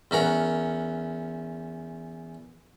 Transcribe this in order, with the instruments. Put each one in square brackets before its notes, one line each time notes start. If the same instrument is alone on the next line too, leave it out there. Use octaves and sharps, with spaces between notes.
[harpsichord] E2 C#4 A#4 F#5